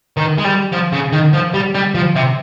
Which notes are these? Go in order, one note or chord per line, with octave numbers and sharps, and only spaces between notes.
D#3
G#3
G3
F3
C#3
D#3
F3
G3
G3
F3
C3